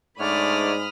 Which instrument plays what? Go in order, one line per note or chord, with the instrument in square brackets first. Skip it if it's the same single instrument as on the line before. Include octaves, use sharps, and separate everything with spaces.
[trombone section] G#2 [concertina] A3 D4 C#5 [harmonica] D5 [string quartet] B5 D#6 F6